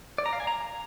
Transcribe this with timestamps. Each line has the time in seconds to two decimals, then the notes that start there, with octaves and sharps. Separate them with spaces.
0.18 D5
0.26 A#5
0.33 F5
0.40 G#5
0.47 A#5